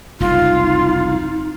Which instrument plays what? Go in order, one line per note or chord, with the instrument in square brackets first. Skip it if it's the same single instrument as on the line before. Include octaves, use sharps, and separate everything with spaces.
[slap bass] F#1 C2 F2 [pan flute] D#4 [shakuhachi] F4